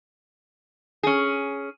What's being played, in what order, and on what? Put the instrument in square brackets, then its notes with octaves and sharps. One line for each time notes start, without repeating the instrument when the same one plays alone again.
[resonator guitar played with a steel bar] C#4 G#4